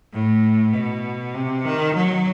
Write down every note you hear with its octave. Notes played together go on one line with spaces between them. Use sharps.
A2
B2
C3
D#3
F#3